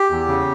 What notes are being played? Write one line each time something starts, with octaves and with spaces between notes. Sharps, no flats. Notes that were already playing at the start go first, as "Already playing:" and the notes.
Already playing: G4
E2
C#3